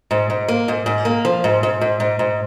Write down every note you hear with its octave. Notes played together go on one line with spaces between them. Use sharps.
G#2
G#2
A#3
G#2
G#2
A#3
F3
G#2
G#2
G#2
G#2
G#2